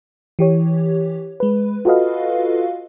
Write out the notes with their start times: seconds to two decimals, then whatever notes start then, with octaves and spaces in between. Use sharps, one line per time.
0.39 E3 G4 C#5
1.40 G#3 B4
1.85 F4 F#4 A4 B4 D#5 F5